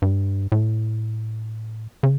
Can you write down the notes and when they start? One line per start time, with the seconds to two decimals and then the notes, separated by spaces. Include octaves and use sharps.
0.02 G2
0.52 A2
2.03 C#3